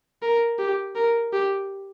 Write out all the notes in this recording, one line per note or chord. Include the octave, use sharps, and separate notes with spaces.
A#4
G4
A#4
G4